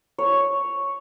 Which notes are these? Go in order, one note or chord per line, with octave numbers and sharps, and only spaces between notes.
C#5